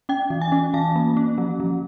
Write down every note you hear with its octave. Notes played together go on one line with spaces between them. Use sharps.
C#4 G5
E3
G#5
C#4
E3 A5
A#3
C#4
F3
F3